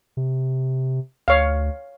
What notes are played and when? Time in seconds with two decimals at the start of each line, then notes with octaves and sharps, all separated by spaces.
0.17 C3
1.28 D2 C#5 F5